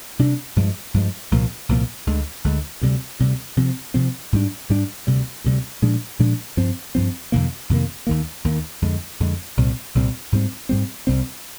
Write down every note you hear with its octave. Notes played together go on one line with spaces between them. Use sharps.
C3 G3 D4
G2 F3 G#3
G2 F3 G#3
C2 A#2 F3 A#3
C2 A#2 F3 A#3
D2 D3 G#3
D2 D3 G#3
D2 C3 G3
D2 C3 G3
C3 F3 C4
C3 F3 C4
G#2 G3 D4
G#2 G3 D4
D2 C3 G3
D2 C3 G3
A#2 F3 G#3 D4
A#2 F3 G#3 D4
G2 F3 C4
G2 F3 C4
F2 C3 D#3 A#3
F2 C3 D#3 A#3
D#2 D#3 A#3
D#2 D#3 A#3
F2 D3 G#3
F2 D3 G#3
C2 A#2 G3 C4
C2 A#2 G3 C4
G#2 G3 C4
G#2 G3 C4
C2 C3 G3 C4